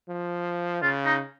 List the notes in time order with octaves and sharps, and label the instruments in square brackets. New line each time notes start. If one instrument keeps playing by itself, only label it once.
[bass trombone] F3
[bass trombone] C#3 [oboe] F4
[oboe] D#4